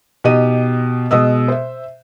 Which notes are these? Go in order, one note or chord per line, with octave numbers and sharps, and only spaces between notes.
B2 D#4 G4 D#5 D#7
B2 G#3 D#5 D#6 E6
C5 E5